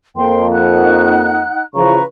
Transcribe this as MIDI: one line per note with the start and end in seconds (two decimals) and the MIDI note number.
0.17 1.45 41
0.17 1.45 58
0.17 0.46 79
0.17 0.46 84
0.52 1.63 63
0.52 1.63 78
0.52 1.63 90
1.75 1.98 49
1.75 1.98 52
1.75 1.98 53
1.75 2.03 71
1.75 2.03 82
1.75 2.03 85